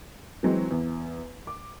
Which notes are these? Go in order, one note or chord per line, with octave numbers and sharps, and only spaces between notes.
E3 F#3 G#3 C4
E2
D6